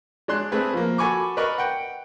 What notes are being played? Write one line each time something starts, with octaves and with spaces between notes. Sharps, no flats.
G#3 D4 C6 F#6
A3 C4 G#4 B4
F3 A#3
F#4 A4 G#5 B5 C#6 D6
A#4 B4 D5 D#5 B5 C#6
F#5 G5